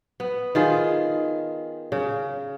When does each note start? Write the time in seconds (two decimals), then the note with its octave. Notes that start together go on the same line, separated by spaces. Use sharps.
0.20 B3
0.55 D#3 F4 G#4
1.92 C#3